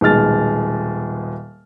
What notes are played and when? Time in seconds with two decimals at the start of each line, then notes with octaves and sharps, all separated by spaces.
0.01 D#1 B2 G#3 F6 A6